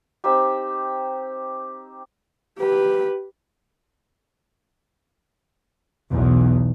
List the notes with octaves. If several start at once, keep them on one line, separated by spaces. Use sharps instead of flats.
C4 D#4 G4
G4 B4
B1 E2